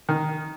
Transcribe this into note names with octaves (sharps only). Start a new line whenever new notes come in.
D#3